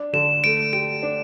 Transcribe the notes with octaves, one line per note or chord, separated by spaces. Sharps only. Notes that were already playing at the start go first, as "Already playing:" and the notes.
Already playing: D4
D3 E7
A3 D7
G4 D7
D4